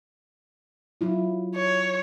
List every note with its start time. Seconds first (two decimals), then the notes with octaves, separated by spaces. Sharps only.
1.01 F#3 E4 F4
1.56 C#5